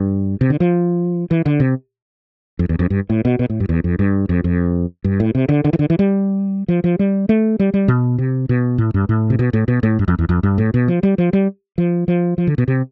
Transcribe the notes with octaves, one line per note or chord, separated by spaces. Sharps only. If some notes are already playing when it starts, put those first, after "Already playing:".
Already playing: G2
C3
D3
F3
E3
D3
C3
F2
E2
F2
G2
A2
B2
B2
A2
G2
E2
F2
G2
F2
F2
G2
A2
C3
D3
D3
E3
D3
E3
G3
F3
F3
G3
A3
G3
G3
B2
C3
B2
A2
G2
A2
C3
B2
A2
B2
A2
G2
F2
E2
F2
G2
A2
B2
F3
G3
F3
G3
F3
F3
F3
D3
B2
C3